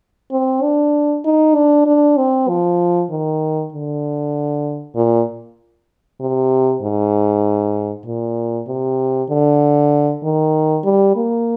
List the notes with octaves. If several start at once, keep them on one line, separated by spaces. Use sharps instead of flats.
C4
D4
D#4
D4
D4
C4
F3
D#3
D3
A#2
C3
G#2
A#2
C3
D3
D#3
G3
A#3